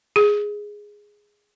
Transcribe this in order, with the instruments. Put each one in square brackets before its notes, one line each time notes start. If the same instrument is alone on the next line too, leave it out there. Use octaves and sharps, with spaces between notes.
[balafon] G#4